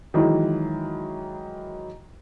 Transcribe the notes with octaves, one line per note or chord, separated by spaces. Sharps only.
D#3 E3 F#3 G#3 E4